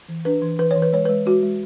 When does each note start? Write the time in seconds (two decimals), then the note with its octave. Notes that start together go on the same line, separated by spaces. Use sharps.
0.08 E3
0.25 D4 B4
0.42 E3
0.59 E3 B4
0.71 C#5
0.76 E3
0.82 B4
0.92 G#3 C#5
1.05 G#3 B4
1.26 G#3 F#4
1.43 G#3